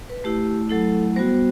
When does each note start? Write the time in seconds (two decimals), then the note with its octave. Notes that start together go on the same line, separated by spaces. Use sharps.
0.09 B4
0.24 A3 E4 G4
0.70 F#3 A3 E4 A4
1.16 G3 B3 F#4 C5